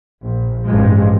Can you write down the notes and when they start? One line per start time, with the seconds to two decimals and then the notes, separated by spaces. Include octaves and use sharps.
0.23 A#1
0.64 A1 G2 F3 G#3